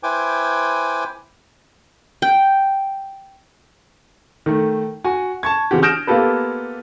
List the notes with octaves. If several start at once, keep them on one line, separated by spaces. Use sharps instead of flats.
E4 B4 C5 G5 G#5 D6
G5
D#3 A3
F#4 G#5
A5 C#6 G#6
C#3 E3 C4 F#4 G4
D#6 F6 G6 A#6 D7 E7
A#3 B3 F4 G4 A4 B4